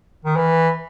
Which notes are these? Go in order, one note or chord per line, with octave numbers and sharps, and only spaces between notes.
D#3
E3